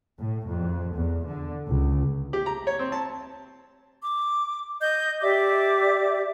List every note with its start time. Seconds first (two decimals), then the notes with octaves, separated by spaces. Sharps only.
0.19 A2
0.47 F2
0.94 E2
1.26 D3
1.68 C#2
2.33 G4
2.46 A#5
2.67 C#5
2.79 C4
2.92 A5
4.02 D6
4.80 D#5 G6
5.22 G4 D5 E5 D6